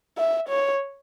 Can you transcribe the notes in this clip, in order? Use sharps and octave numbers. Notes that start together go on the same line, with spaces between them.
E5
C#5